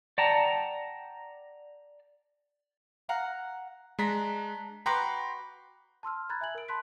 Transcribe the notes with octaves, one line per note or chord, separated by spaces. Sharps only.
D5 F#5 G5 A5 A#5
F5 F#5 A#5
G#3 D4 A#5 B6
F#4 B4 G5 A#5 C6 D6
A5 C6 E6 F6
A#5 B5 F#6 G#6 A6
E5 G#5 G#6 F#7
A#4 D7
A5 B5 C6 F#6 B6